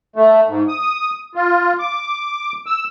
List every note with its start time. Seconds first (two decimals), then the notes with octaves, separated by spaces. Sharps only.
0.16 A3
0.47 G#2
0.68 D#6
1.35 F4
1.79 D6
2.66 E6